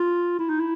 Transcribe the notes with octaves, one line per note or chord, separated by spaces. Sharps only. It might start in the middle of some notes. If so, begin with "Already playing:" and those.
Already playing: F4
E4
D#4
E4